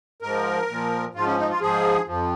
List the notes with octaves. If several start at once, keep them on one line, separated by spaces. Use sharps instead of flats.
G#2 F3 A#4
A#2 F3
G#2 F3 F4
C#4
D#4
F4
G#2 F3 G#4
F2 F3